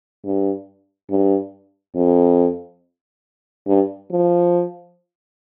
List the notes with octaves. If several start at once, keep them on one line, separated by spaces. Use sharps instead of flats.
G2
G2
F2
G2
F3